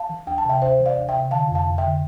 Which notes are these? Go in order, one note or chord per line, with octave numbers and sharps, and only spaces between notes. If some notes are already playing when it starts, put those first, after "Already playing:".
Already playing: F5 A5
E3
D2 G5
A5
C3 E5 G5
D2 C5 E5
E3
D5 F5
D2
E5 G5
C3
D3 F5 A5
F2
F5 A5
F2
E5 G5
D3